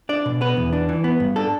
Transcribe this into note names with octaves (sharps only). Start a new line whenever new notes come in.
D4 D5
B2
B3 B4
E2
D4
E3
B3
G2
D4 A4